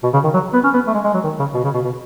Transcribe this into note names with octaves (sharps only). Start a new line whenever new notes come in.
B2
C#3
D#3
F#3
B3
C#4
B3
A3
G#3
G#3
F#3
D#3
C#3
B2
C#3
B2
B2